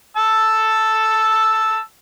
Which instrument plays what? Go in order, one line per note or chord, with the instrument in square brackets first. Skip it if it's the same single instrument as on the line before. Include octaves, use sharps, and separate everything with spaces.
[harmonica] A5 E6